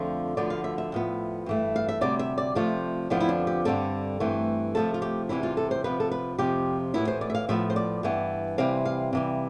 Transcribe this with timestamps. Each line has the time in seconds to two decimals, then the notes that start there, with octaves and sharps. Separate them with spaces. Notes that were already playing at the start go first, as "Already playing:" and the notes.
Already playing: F2 D3 F3 A3 C4
0.37 D2 D3 F3 B3 D5
0.50 F5
0.64 E5
0.78 E5
0.92 A2 F3 B3
1.46 G2 E3 A3
1.76 F5
1.89 E5
2.01 D2 C3 G3 D5
2.19 E5
2.38 D5
2.55 C3 F3 A3 C4 F4
3.10 F2 D3 F3 B3 E4
3.20 E4
3.29 D4
3.47 G4
3.65 G2 D3 G3 C4 A4
4.20 G2 E3 A3 C4
4.75 C3 F3 A3 A4
4.94 F4
5.02 G4
5.29 E2 C3 E3 G3 C4 E4
5.43 F4
5.57 A4
5.71 C5
5.84 C3 F3 B3 B4
6.00 A4
6.11 B4
6.38 F2 C3 F3 G4
6.94 A2 E3 B3 E4
7.08 C5
7.21 D5
7.30 E5
7.35 F5
7.48 A2 F3 B3 E5
7.70 C5
7.76 D5
8.03 G2 E3 B3
8.58 C3 E3 G3 C4 F5
8.85 F5
9.13 C3 E3 G3